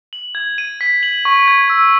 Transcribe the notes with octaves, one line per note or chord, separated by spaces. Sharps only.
F#7
G#6
D#7
B6
F#7
C#6
G#6
E6